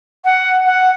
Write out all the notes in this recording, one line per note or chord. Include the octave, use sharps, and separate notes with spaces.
F#5
F#5